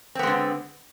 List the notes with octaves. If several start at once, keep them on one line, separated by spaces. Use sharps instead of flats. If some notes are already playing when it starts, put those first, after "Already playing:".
D3 G#3 B3 C4